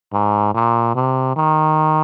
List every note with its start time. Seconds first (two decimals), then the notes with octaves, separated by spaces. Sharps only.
0.13 G#2
0.54 A#2
0.95 C3
1.36 D#3